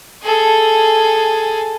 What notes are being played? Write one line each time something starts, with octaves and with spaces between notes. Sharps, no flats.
G#4 A4